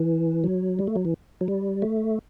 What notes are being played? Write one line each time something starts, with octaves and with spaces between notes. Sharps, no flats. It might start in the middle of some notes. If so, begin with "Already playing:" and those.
Already playing: E3
F#3
G3
A3
F#3
E3
F#3
G3
A3